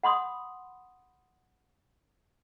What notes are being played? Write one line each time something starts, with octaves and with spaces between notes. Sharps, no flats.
F#5 B5 C6 D#6